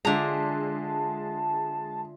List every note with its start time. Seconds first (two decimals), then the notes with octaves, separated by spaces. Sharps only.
0.05 D3 G#3 F4 E5 A5 A#5